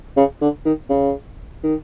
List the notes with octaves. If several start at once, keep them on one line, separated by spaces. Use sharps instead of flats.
C#3
D3
D#3
C#3
D#3